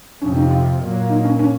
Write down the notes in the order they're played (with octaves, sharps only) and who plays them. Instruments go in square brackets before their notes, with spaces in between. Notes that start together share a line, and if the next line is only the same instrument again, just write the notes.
[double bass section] F2 C3 F3 [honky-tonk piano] C#4
[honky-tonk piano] D#4
F4
[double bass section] A#2 F#3 A#3
[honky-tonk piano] D#4
C#4
C#4